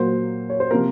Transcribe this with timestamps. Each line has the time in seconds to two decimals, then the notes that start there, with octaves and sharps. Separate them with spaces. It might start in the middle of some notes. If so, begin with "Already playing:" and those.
Already playing: A#2 F#3 A#3 C5
0.50 C#5
0.60 C5
0.71 C3 F3 A#3 A#4